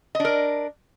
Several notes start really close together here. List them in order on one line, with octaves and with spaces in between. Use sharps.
D#5 D4 A#4